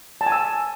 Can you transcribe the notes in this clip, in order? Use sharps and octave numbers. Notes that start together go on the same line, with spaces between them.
A5
G#5
E6